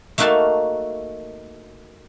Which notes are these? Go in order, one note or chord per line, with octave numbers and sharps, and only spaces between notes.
A3 A#3 D#4 F#4 F5 A5